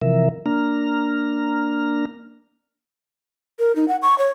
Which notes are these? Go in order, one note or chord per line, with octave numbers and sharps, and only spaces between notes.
C3 E3 F3 A#4 E5
A#3 D4 A#5 F6
A#4
D#4
F#5
C#6
C#5